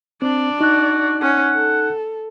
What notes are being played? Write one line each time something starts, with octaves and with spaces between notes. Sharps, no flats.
C4 D4 D5
D#4 F#4 F#6
C#4 F#5
A4